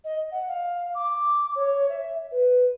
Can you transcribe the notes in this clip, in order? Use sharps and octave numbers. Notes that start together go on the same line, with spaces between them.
D#5
F#5
F5
D6
C#5
E5
B4